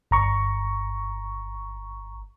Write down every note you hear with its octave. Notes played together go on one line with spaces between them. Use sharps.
G1 A#5 C#6